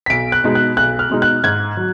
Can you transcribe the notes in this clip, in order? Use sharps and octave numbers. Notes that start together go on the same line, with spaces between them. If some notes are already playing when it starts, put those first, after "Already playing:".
B6
B1 D7
F#6
B2 G#3 D#4
F#6
B1 F#6
F6
B2 G#3 D#4
F#6
G#2 G#6
F#3